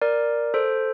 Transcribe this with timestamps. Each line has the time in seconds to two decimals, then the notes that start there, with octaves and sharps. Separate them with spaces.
0.02 A#4 D5
0.54 A4 C5